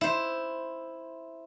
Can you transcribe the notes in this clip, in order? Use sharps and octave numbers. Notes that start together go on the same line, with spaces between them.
E4 C5